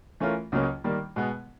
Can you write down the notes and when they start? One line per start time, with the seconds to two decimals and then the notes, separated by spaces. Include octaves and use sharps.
0.20 E3 A3 C#4 F4 A#4
0.52 C#2 C#3 F#3 A#3 C#4
0.84 D#3 G3 A#3
1.16 B2 G#3 B3